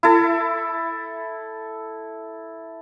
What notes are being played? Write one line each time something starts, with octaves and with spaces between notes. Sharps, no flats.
E4 A4